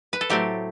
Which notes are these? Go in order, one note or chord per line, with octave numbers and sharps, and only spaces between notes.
B4
A4
A2 F#3 A3 C4 G4